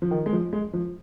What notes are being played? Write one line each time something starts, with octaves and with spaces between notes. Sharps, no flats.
F3
D#3
G#3
F3
G#3
F3